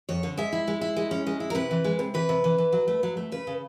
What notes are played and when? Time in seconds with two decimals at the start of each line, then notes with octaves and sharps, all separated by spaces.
0.09 F2 C#5
0.23 D3
0.37 G#3 E5
0.53 E4
0.68 G#3
0.81 E4
0.96 G#3
1.11 C#4
1.27 G#3
1.40 E4
1.50 A#4
1.55 C3 B4
1.71 E3
1.84 G#3
1.99 C3
2.14 E3 B4
2.29 C3
2.44 E3
2.58 E3
2.72 F#3
2.88 A3
3.03 F#3
3.17 A3
3.32 C#3 B4
3.47 C#3